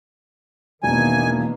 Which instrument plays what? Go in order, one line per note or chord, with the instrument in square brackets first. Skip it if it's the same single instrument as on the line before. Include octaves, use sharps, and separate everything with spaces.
[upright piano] E1 [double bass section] D#3 E3 A#3 [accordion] G#5